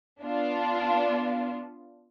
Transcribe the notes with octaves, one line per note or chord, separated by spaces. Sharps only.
B3 D4 F4